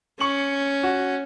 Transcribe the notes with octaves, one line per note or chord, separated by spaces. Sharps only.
C#4 C#6 C#7 F#7
F#4